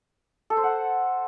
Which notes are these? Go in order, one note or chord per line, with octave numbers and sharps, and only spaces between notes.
A4
C5
F#5